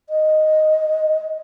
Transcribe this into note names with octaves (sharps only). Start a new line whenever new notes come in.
D#5